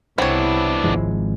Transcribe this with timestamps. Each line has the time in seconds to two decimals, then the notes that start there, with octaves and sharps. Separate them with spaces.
0.18 C2 B3 C4 D4 E4 C#5
0.84 G#1 F3 G#3